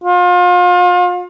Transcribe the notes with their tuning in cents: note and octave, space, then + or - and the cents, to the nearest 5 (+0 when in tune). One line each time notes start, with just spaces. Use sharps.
F4 +35